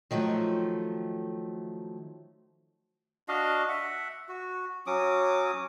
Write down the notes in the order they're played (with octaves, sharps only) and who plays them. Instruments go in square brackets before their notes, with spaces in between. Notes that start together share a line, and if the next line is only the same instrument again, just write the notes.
[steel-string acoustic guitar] D#3 F3 F#3 A3
[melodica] D4 F#4 D#5 F5
E5 F#5
F#4
F#3 C#4 D6 D#6